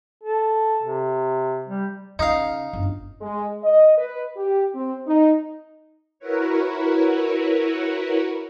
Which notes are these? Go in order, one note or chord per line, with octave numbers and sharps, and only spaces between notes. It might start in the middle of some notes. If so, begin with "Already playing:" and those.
A4
C3
G3
C#3 D#4 F5
G1 F#2
G#3
D#5
B4
G4
C4
D#4
E4 F#4 A#4 B4 C#5